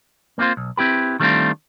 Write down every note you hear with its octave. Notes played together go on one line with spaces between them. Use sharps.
A#3 C4 D#4 F4 C5
B1
C4 E4 G4 B4
D#3 G3 A3 C4 D4 F4